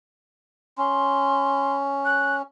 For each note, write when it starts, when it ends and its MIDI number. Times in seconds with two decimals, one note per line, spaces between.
0.78 2.42 61
0.78 1.75 84
2.05 2.36 90